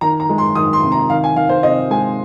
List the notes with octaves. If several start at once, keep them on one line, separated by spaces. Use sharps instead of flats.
D#3 A#5
A#5
G#3
C6
D#3 D#6
C6
C3
A#5
D#3 F5
G#5
D#3 F5
C5
C3 D#5
G#3 G#5